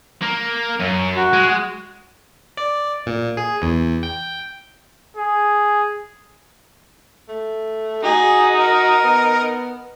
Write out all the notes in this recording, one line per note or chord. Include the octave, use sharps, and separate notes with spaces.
A#3
F#2
F#4
G#3
D5
A#2
G#4
E2
G5
G#4
A3
D#4 F#4 G#4
A#4
B3